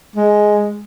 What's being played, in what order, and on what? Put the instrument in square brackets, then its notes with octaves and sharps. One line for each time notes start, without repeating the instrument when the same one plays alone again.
[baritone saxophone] G#3